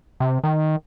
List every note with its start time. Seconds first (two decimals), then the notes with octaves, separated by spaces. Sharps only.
0.20 C3
0.44 D#3